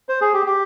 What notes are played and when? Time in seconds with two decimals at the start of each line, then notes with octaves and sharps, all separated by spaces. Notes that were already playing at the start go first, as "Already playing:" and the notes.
0.09 C5
0.21 G#4
0.34 G4
0.46 G4